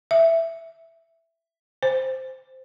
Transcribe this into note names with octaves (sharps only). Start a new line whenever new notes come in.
E5
C5